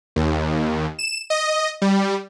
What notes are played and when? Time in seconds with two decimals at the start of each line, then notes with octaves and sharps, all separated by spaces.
0.16 D#2
0.99 E7
1.30 D#5
1.82 G3